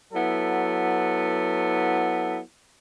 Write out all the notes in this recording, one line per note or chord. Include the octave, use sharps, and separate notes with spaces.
F#3 B3 E4 A4